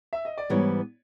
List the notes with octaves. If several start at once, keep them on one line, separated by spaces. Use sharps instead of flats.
E5
D#5
D5
G#2 E3 G3 B3 C#5